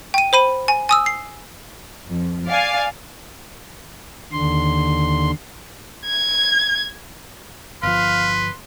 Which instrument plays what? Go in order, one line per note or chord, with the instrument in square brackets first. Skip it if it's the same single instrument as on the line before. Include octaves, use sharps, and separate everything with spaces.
[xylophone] G5 D#7
C5 B5 D#7
G#5
G#5 D#6 E6
C7
[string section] F2
D5 F5 G#5
[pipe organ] D#2 D3 C6
[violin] G#6
[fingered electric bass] G1 F3 [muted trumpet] B4 [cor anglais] F5 [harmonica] C6